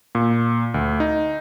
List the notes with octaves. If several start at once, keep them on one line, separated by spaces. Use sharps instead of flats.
A#2
D2
D#4